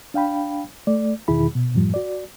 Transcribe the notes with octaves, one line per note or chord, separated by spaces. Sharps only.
D4 F5 G5 B5
A3 D5
E2 B2 D#3 E4 G#4 B5
B2
F#2 A2 F3 G3
F#4 D5